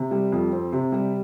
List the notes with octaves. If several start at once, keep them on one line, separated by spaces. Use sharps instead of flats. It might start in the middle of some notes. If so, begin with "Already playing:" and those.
Already playing: C3
G3
F2
C4
C3
G3